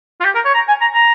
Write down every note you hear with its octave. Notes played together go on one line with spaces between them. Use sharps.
F4
G4
A#4
C#5
A#5
G#5
A#5
A#5